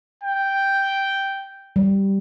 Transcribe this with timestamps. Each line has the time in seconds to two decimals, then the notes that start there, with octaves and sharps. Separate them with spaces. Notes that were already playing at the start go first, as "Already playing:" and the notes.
0.23 G5
1.76 G3